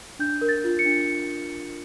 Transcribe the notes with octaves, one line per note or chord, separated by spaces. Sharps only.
D4 G6
A#4
A6
F4
C#7
D4